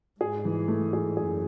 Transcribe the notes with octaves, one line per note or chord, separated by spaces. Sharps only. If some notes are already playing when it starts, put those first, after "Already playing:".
G#2 G#4
E3
A3
G#4
F#2 G#4